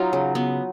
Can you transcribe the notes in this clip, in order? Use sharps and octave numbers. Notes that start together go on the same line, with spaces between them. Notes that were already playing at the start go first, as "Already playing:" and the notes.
Already playing: F#3 D#4 F4
C#3
C#3 B3